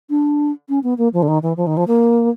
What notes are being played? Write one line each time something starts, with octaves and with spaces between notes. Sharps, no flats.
D4
C#4
B3
A#3
F3
D3
D#3
E3
F3
D#3
F3
A#3